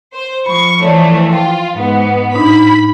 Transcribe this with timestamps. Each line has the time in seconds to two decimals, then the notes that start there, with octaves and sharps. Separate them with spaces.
0.13 C5
0.46 F3 B5 C#6
0.81 E3 F3 A3 C#5 D5
1.32 F4 G5
1.74 G#2 B3
2.34 A2 D4 D#4 B5